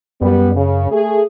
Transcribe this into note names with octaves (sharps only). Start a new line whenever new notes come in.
F#2 G3 B3
C#3
A3 G#4